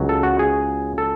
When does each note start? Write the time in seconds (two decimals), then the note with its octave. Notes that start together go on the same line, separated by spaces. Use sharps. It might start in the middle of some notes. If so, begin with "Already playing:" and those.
Already playing: C#2 C#3 F#3
0.09 A4
0.23 F#4
0.39 G#4
0.98 A4